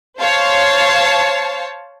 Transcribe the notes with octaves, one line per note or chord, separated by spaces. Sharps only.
C5 C#5 F5 A5